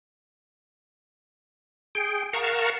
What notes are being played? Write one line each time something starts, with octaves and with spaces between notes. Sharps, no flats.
G#4 G5
A#4 F5 F#5 A5 A#5 C#6